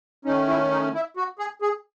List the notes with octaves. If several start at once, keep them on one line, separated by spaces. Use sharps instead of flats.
D#3 A3 C#4 D#4
E4
D#4
E4
F#4
G#4
G#4